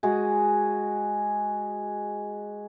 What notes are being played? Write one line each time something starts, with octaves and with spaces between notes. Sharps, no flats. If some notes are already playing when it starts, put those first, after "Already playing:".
G#3 F#4 G#4